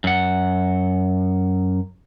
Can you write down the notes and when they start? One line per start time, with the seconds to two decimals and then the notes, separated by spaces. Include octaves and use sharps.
0.04 F#2 F#5